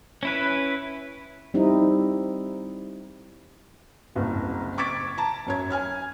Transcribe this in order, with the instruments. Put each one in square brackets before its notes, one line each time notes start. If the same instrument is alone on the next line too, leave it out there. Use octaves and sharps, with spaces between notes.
[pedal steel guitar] C#4 E4 B4
[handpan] G3 C4 D#4 E4
[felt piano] F#1 C2
C#6 D6 G#6 A6 B6 D7
A5 A#5
F#2 C#5 G#6
G#5 F6 G#6